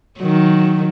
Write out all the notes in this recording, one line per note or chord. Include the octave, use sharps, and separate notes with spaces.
D#3 F#3